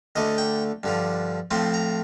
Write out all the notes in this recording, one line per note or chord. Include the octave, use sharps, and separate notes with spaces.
D2 D3 A3 D#5
G5
G2 D3 F3
A2 F3 A3 C4 C6
A#5